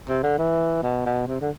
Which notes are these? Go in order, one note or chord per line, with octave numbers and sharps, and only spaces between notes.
C3
D3
E3
B2
B2
C3
D3